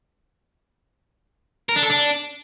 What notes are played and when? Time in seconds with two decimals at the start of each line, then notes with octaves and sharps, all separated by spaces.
1.69 A#4
1.76 D4
1.83 A4
1.90 D4